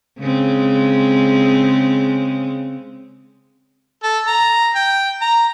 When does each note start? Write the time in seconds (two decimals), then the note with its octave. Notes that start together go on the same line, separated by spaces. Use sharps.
0.19 C#3 G#3 C4
4.03 A4
4.27 A#5
4.75 G5
5.21 A#5